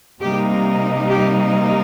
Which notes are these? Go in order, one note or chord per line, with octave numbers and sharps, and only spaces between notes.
C3 G3 A#3 D#4 G4
G4